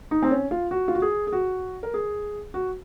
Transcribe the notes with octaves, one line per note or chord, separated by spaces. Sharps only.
D#4
C4
C#4
F4
F#4
F4
F#4
G#4
G#4
F#4
A#4
G#4
F#4